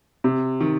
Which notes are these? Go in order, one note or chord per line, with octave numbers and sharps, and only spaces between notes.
C3
D#3